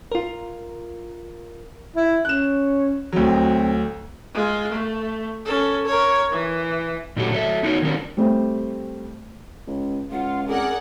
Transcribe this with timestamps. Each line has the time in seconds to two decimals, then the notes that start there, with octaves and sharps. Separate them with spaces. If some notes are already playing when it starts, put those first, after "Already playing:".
0.12 F4 A#4
1.96 E4
2.25 C#4 F#6 E7
3.13 D2 F#3 C4
4.35 G#3 F4
4.72 A3
5.45 C#4 A4
5.86 A#4 C#5
6.32 E3
7.16 A#2 D3 F#3 A3 F#4 G4
7.32 F#3 A4 D#5 E5
7.63 B3 D#4 F#4 A4 A#4 C#5
7.82 D#3 F#3 G3 C4 D4 A#4
8.17 G3 A3 C4
9.67 C#2
10.11 C#2 F4 F#5
10.48 C4 G#4 A#4 D5 F#5